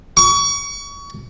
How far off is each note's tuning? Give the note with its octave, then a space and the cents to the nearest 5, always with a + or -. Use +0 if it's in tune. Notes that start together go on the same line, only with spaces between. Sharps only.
C#6 +30